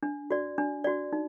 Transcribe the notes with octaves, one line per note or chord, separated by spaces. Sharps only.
D4
F#4 D5
D4
F#4 D5
D#4